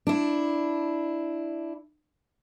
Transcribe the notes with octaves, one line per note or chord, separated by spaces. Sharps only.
D4 E4